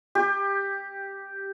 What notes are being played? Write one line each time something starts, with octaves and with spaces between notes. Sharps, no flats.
G4